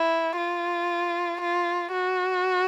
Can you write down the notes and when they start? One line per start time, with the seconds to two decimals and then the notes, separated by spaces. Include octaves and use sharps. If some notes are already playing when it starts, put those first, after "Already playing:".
Already playing: E4
0.37 F4
1.41 F4
1.92 F#4